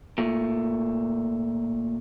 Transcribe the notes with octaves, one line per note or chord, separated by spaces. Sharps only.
A#2 A3